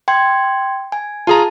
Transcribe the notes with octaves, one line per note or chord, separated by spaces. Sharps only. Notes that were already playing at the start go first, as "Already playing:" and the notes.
G5 C6 G#6
G#5
F4 G#4 A5 A#5